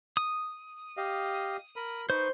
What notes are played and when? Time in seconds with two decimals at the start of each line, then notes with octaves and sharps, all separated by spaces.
0.17 D#6
0.97 G4 D#5 F5
1.76 A#4 B5
2.10 D#4 B4 C5 C#6